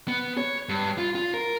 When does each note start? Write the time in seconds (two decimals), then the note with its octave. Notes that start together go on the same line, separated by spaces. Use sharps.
0.08 B3
0.37 C#5
0.69 G2
0.98 F4
1.15 F4
1.34 A#4